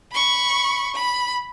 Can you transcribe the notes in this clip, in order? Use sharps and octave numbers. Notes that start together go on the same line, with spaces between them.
B5 C#6
B5